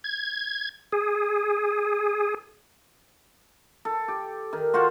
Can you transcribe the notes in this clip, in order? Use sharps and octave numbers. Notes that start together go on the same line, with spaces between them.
G#6
G#4
A4
G4
D#3
F4 F#4 C5 F#5